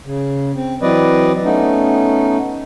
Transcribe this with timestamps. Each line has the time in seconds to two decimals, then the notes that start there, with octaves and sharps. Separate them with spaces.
0.05 C#3
0.55 C4
0.82 E3 F#3 C4 B4 D5 D#5
1.44 A3 B3 C#4 D#4